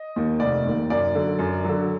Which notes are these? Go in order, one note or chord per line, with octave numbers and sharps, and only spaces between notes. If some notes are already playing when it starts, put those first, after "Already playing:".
Already playing: D#5
D#2 D#3
F1 D5
D#2 D#3
F#2 D5
D3 F#3
F#2
D3 F#3